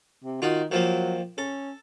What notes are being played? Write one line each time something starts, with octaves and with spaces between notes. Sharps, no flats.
C3
D#3 F4 F#4
D#3 F3 F#3 A#3
C#4 A4